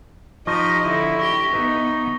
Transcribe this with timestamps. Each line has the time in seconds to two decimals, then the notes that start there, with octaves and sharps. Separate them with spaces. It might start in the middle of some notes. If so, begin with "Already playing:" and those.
0.47 F3 D#4 G4 D#5 C#6 A#6 D#7
0.84 D3 E4
1.19 G4 C#6 A#6 G7
1.53 B3 D#4 B4 E5